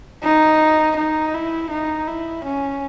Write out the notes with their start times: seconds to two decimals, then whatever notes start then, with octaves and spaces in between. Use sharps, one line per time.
0.24 D#4
0.97 D#4
1.34 E4
1.70 D#4
2.07 E4
2.44 C#4